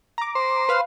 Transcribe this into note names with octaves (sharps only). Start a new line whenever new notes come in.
A#5 D6
C5
B4 F5